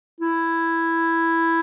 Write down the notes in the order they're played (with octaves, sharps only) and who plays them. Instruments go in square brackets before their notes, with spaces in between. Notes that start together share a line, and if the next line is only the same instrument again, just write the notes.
[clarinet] E4